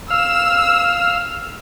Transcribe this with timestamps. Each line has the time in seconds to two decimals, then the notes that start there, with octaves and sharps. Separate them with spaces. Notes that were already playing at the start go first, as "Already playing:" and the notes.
0.10 F5 E6